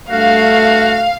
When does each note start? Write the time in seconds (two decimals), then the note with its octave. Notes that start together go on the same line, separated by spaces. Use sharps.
0.10 G2 A3 F#4 F5